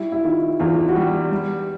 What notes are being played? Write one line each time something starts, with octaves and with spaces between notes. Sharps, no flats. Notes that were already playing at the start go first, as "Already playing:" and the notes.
Already playing: G3 E4
E4
D#3 F4
E2 F4
F#4
G3 G4
G3